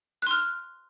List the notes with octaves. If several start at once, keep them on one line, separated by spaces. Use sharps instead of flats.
C6 F6 F#6